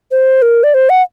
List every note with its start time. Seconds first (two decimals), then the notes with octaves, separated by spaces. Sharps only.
0.11 C5
0.42 A#4
0.64 D5
0.74 C5
0.90 F#5